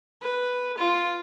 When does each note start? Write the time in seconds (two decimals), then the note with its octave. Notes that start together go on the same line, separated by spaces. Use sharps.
0.22 B4
0.77 F4